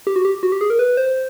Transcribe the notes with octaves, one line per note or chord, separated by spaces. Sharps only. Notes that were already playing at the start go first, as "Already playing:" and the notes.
G4
F#4
G4
F#4
G4
G#4
A#4
B4
C5